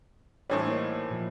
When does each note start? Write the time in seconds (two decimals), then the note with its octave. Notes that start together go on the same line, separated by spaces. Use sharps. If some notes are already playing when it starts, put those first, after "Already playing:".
0.50 A2 E3 G3 C5 C#5
0.67 A#3 D#4
1.11 A#2 F3